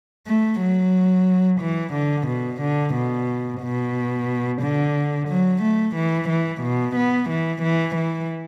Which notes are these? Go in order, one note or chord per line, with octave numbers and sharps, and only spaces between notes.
A3
F#3
E3
D3
B2
D3
B2
B2
D3
F#3
A3
E3
E3
B2
B3
E3
E3
E3